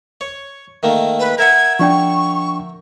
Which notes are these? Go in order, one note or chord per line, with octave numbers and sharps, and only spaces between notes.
C#5
D#3 A3 A#3
B4
A#4 E5 F#5 G#6
F3 D4 G5 C#6